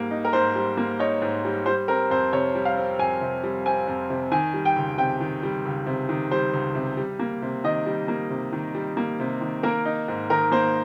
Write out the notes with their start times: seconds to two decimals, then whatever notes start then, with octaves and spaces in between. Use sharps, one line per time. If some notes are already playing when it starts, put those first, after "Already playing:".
Already playing: G#2 G3 A#3
0.11 D#4
0.25 A#4
0.33 G#2 C5
0.56 G3
0.77 A#3
0.99 D#4 C#5
1.22 G#2
1.45 G3
1.66 G3 C5
1.88 C4 A#4
2.10 F2 C5
2.32 C3 C#5
2.55 G3
2.65 F5
2.77 C4
2.99 F2 G#5
3.21 C3
3.44 G3
3.65 C4 G#5
3.87 F2
4.10 C3
4.31 D#3 G#5
4.54 G3
4.65 G5
4.76 C#2
4.98 C3 G5
5.20 D#3
5.43 G3
5.65 C#2
5.86 C3
6.09 D#3
6.31 G3 C5
6.54 C#2
6.75 C3
6.97 G3
7.19 A#3
7.42 C3
7.64 D#3 D#5
7.86 G3
8.08 A#3
8.30 C3
8.53 D#3
8.75 G3
8.97 A#3
9.20 C3
9.41 D#3
9.63 A#3 A#4
9.85 D#4
10.08 G#2
10.30 D#3 A#4
10.52 A#3 C5